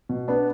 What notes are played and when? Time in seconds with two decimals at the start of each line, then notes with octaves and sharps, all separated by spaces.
0.09 B2
0.28 B3 D4